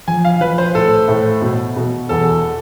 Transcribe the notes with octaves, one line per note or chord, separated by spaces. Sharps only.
F3 G#5
F5
F3 B4
C5
A2 A4
A2
B2
B2
E2 A4